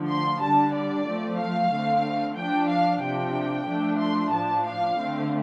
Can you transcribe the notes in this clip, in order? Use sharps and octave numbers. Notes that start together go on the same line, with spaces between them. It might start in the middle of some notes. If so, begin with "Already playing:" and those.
Already playing: D3 F3 A3
C6
D3 G3 D4 A5
D5
F3 A3 C4
F5
D3 A3 C4
F3 D4 G5
F5
C3 F3 D4 G5
F3 A3 D4
C6
A2 F3 D4 A5
F5
D3 A3 C4